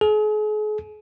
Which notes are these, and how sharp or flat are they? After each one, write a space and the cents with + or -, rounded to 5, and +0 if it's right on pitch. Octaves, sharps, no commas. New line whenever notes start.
G#4 +40